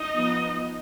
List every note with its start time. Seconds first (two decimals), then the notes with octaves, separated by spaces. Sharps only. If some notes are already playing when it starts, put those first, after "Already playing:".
Already playing: D#4 D#5
0.14 F3 B3